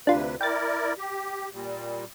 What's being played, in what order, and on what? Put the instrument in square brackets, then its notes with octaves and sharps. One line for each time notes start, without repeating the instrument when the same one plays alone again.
[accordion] D2 C3 B4 [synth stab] D4 F4
[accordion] E4 A#4 D5 [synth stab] G5 A6
[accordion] G4
A#2 G3